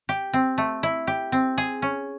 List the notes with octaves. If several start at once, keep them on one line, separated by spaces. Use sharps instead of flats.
G4
C4
A3
E4
G4
C4
G#4
C#4